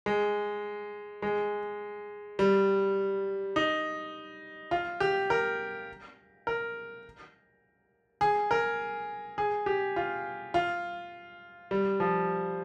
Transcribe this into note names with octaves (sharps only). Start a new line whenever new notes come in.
G#3
G#3
G3
D#4
F4
G4
A#4
A#4
G#4
A#4
G#4
G4
F4
F4
G3
F3